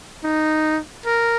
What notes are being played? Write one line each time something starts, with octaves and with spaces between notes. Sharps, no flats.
D#4
A#4